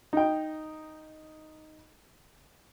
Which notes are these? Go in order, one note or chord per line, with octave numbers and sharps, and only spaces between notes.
D#4 G5